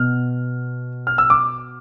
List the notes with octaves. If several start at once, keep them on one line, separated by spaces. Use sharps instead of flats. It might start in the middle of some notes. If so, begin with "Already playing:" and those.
Already playing: B2 B3 F6
F6
E6
D6